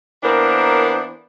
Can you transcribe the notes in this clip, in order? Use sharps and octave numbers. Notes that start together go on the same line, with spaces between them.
E3 A#3 B3 D4 A#4 C5